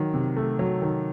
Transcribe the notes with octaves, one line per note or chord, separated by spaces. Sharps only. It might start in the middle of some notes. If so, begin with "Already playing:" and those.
Already playing: D#3 F#3
C3
A3
F#3
D#3